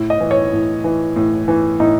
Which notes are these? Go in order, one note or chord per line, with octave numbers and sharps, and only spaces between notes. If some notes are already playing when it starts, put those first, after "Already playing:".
Already playing: A2
D#5
E3
C#5
A2
E3
A2
E3
A2 D#4